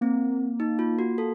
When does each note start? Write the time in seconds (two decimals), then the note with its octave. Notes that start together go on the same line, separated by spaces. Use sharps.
0.01 A#3 C4
0.60 D#4
0.79 F4
0.99 F#4
1.18 A4